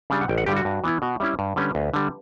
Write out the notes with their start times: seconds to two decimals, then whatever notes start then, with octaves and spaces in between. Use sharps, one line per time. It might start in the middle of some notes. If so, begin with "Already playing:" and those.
0.10 C#3 G3 D4
0.21 F#5
0.28 A1 G5
0.38 F#5
0.46 G2 D3 G3 G4
0.56 F#4
0.65 G2
0.84 E3 B3 E4
1.02 B2 F#4
1.20 G3 C#4 E4 E5
1.39 G2
1.56 D3 G3 C#4 B4
1.75 D2
1.94 D3 G3